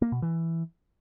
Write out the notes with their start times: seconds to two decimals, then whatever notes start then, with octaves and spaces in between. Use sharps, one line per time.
0.02 A#3
0.12 B2
0.22 E3